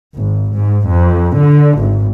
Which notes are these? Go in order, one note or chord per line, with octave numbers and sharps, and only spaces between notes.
G#1
G#2
F2
D3
G#1